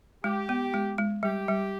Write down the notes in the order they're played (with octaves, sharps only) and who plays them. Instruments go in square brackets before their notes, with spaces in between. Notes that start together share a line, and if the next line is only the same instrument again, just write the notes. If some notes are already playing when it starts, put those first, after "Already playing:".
[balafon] G#3 [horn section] G4
[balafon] B3
G#3
G#3
[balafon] G3 [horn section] G4
[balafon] G3